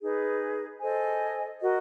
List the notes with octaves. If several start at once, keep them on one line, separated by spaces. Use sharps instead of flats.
D#4 G#4 B4
A4 C5 D#5 G#5
F#4 A#4 D#5